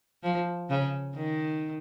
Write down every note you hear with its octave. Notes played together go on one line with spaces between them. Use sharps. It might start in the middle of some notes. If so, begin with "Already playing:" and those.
F3
C#3
D#3